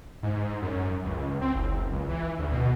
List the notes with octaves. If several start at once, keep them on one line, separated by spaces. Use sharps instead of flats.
G#2
F#2
C#2
C4
F#1
C#2
E3
D2
B2